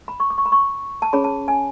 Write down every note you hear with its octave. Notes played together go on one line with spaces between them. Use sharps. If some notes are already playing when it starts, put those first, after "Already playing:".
B5
C#6
D6
C#6
B5
C#6
A5
C#4 G#4 C#5 B5
A5
G#5